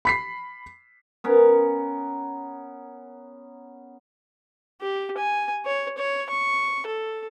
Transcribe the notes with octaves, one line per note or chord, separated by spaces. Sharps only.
B5 B6 C7
B3 C#4 A#4
G4
G#5
C#5
C#5
C#6
A4